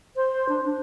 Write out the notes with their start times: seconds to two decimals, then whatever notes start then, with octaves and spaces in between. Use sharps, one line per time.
0.16 C5
0.49 D4
0.64 D4